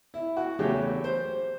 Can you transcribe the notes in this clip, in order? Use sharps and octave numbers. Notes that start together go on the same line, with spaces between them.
E4
F#4
E2 C#3 F#3 A3 G4
C5